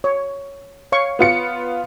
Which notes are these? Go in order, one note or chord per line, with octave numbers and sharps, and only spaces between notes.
C#5
C#5 F5 C#6
B3 F4 C#7